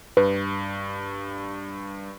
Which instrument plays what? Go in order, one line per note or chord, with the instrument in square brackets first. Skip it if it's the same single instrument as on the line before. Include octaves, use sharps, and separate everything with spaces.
[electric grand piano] G2 [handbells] B4